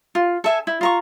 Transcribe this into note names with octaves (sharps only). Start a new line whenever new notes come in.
F4
A4 E5 G#5
E4
F4 A#5 C#6